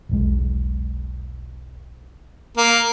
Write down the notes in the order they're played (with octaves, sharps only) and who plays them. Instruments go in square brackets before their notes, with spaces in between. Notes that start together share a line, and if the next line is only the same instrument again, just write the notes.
[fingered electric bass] E1 B1 G#3
[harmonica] A#3